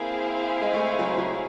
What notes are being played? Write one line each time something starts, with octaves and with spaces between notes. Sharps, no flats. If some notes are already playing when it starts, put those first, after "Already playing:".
Already playing: A#3 C4 E4 G#4 C5 F5
G#3
A3
G#3
F#3
F#3